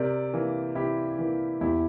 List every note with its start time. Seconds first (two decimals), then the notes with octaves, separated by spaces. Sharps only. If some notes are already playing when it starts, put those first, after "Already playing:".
Already playing: C3 A#4 D5
0.33 E3 A#3
0.75 C3 E4 G4
1.18 E3 A#3
1.61 E2 E4 G4